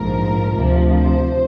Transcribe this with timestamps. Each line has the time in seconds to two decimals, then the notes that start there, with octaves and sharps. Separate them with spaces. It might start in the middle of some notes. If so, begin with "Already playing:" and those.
Already playing: A#1 G#2 F3 A#4
0.53 D2 C3 F3
0.94 C5